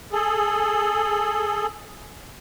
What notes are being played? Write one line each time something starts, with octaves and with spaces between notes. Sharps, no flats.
G#4 A4